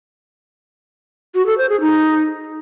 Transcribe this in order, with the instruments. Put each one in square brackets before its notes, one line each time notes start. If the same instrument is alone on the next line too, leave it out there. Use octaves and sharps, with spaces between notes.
[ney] F#4
A4
C5
G#4
D#4